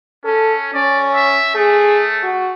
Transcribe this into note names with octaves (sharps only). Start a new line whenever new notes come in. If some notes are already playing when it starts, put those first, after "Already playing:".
C#4 A4
C#4 D5
E5
A3 G#4
F#4